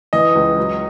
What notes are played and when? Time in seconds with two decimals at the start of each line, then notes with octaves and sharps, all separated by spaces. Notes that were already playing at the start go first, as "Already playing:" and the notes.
0.13 E3 D#5
0.35 C#2
0.58 F#3